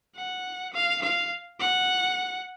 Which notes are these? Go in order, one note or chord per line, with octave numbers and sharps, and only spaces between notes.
F#5
F5
F5
F#5